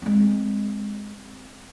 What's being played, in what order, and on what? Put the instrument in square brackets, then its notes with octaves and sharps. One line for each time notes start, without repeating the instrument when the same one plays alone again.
[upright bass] G#3 C4